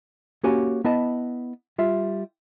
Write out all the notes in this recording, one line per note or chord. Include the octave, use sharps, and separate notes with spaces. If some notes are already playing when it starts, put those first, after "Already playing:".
A#3 C#4 F#4 G4 C#5 G#5
B3 E4 D#5 A5
G3 F4 E5